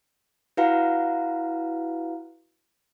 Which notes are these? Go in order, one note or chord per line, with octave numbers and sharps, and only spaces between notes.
E4 F#4 B4 F5 F#5 A#5